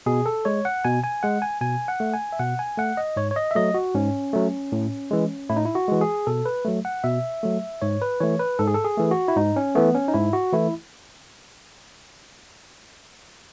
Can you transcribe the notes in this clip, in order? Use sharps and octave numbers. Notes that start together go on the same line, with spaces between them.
B2 G#4
A4
G#3 C#5
F#5
B2 G#5
G#5
G#3 F#5
G#5
B2 G#5
F#5
A3
G#5
E5
B2 F#5
G#5
A3 F#5
D#5
G#2 C#5
C#5
D#5
E5
F#3 A3 D#5
F#4
G#2 C#4
F#3 A3
A2
E3 G#3
A2 E4
D#4
E4
F#4
E3 G#3
G#4
B2 A4
B4
F#3 A3
F#5
B2 E5
F#3 A3
G#2 C#5
B4
E3 A3 C#5
B4
G#2 A4
G#4
A4
G#4
E3 A3
F#4
E4
G#2 D#4
C#4
E3 A3 B3
C#4
D#4
G#2 E4
F#4
E3 A3 E4